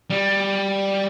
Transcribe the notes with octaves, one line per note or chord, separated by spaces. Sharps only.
G3